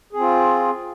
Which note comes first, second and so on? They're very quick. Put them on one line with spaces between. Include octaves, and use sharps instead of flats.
G#4 C4 F4